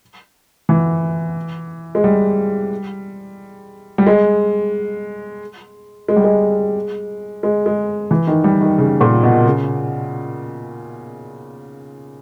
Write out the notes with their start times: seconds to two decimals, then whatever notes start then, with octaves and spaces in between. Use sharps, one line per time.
0.69 E3
1.95 G#3
2.04 G3
3.98 G3
4.06 G#3
6.08 G#3
6.16 G3
6.24 G#3
7.43 G#3
7.66 G#3
8.11 E3
8.27 D#3
8.44 G3
8.61 D#3
8.78 C#3
9.01 A#2
9.23 B2
9.46 C#3